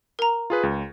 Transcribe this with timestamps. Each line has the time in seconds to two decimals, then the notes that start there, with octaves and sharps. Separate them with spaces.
0.19 A#4 A#5
0.50 F4 G#4 B4
0.63 C#2